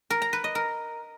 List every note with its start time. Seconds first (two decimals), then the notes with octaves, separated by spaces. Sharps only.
0.10 A#4
0.22 A#5
0.33 B4
0.44 D#5
0.55 A#4